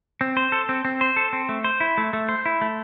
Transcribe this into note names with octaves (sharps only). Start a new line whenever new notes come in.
C4
C5
A4
C4
C4
C5
A4
C4
A3
C5
E4
A3
A3
C5
E4
A3